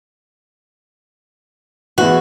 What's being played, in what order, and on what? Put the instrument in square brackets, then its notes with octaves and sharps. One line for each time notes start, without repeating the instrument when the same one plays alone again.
[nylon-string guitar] E2 E3 [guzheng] F#4